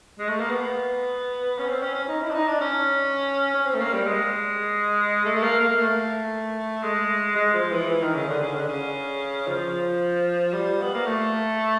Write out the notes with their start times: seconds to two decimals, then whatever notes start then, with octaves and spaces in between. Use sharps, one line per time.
0.19 G#3
0.28 A3
0.40 A#3
0.50 B3
1.59 C#4
1.68 C4
1.82 C#4
1.95 C#4
2.08 D#4
2.22 E4
2.30 D4
2.34 D#4
2.48 D4
2.61 C#4
3.54 C#4
3.67 C4
3.74 A3
3.80 A#3
3.93 G3
4.07 G#3
5.25 A3
5.35 A3
5.43 A#3
5.60 A#3
5.78 A3
6.83 G#3
7.36 G#3
7.54 F3
7.71 E3
7.89 E3
8.02 D#3
8.15 C#3
8.29 D3
8.42 C#3
8.55 D3
8.68 C#3
9.47 F3
10.53 G3
10.82 B3
10.94 A#3
11.06 A3